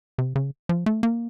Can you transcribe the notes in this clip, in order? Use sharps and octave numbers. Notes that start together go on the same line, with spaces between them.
C3
C#3
F3
A3
A#3